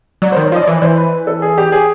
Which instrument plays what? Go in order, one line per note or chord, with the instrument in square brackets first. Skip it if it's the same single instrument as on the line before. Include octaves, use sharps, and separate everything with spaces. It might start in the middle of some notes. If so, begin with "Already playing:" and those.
[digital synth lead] F#3 [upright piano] D5
[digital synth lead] D#3 [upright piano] C5
[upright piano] C#5
[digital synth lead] F3 [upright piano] D#5
[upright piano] D5
[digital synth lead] E3
[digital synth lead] E3 [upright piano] C5
[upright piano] B4
A4
G#4
G4
G#4